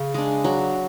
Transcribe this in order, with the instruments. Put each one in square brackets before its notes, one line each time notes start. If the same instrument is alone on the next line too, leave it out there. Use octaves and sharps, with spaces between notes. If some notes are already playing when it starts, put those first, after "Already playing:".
Already playing: [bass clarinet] C#3
[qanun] G#3 D4
F#3